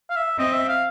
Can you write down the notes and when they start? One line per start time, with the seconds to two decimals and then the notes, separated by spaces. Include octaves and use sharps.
0.09 F5
0.16 E5
0.38 C4 D#5
0.53 E5
0.68 F5